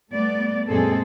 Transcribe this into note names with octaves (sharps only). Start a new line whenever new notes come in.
G3 A3 B3 D5
F#2 A#2 G#3 C4 G#4 A4